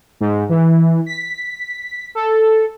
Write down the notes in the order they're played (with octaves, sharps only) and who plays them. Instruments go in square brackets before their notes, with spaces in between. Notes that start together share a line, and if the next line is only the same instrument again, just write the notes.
[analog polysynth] G#2
E3
B6
A4